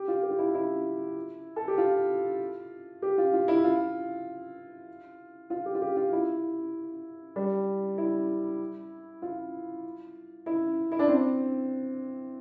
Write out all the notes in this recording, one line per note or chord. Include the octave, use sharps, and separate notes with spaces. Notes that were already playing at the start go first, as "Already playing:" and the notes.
Already playing: G4
F4
G4
F4
E4
E4
A4
G4
F4
G4
F4
F4
E4
F4
F4
G4
F4
G4
F4
E4
G3
E4
F4
E4
E4
D4
C4